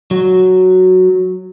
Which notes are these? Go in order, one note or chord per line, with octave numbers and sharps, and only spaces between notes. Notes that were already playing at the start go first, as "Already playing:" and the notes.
F#3